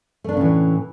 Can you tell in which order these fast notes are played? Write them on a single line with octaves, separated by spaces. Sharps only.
A3 D4 C#3 A2 E3